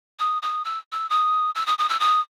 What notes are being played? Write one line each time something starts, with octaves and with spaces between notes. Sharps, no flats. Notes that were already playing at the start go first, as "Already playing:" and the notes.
D#6
D#6
E6
E6
D#6
E6
D#6
D#6
E6
D#6